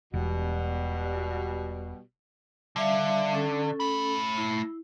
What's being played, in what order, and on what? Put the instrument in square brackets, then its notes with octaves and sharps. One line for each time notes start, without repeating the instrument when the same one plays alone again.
[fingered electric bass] E1 [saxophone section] B2 G3
[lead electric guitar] D3 [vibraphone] G3 E5 F5
[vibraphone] C#4 A4
[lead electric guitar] A3 B5
[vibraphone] E4